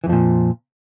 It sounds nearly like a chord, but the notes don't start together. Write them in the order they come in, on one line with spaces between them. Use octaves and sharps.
E3 F2 F3 A#2